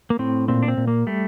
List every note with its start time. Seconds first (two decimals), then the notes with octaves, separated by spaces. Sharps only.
0.10 A#3
0.19 A2 C4
0.48 A#2 C4
0.63 D4
0.68 C4
0.77 A#2
0.88 A#3
1.07 G3 A3